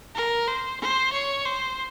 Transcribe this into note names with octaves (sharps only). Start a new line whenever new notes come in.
A#4
C5
C5
C#5
C5